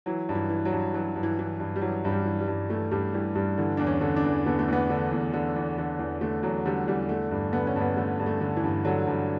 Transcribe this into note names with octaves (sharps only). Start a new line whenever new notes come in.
E3 F#3
G2
E3
E3
F#3
G2
E3 F#3
G2
E3
E3
G2
G3
E3 F#3
G2
G3
E3
G3
G2
E3 A3
G2 G3
E3 G3
G2 G3
D3 E3
E2 D4
C#4
D3
D4
E2
D3 B3
A3
E2 B3
D3
E2
D3
E2
D3
E2
D3 A3
E2 F#3
D3 G3
E2 G3
D3 A3
G2
D3 B3
C#4
G2
B3
D3 A3
G2
A3
D3
E3
G2
D3 F#3
G2